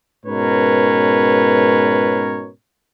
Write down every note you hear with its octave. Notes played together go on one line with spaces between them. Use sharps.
G#2 B2 C#4 A#4 B4 C#5